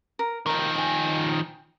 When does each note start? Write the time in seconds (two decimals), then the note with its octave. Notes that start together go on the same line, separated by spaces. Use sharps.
0.19 A#4
0.46 D#3 F3 A#4 G5
0.76 G5 G#5